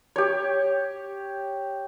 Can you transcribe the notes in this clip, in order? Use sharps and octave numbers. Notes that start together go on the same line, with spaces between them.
G4 C#5